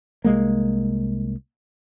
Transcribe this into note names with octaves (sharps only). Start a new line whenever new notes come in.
C2 G#3 A#3